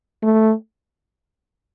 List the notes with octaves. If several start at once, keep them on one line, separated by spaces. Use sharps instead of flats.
A3